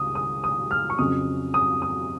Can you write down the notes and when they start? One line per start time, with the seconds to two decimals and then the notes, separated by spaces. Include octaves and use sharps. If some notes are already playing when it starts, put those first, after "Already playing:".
Already playing: C#2 D#6
0.15 D#6
0.44 D#6
0.71 F6
0.90 C#6
0.98 F2 C#3 F#3 D#6
1.54 D#6
1.82 D#6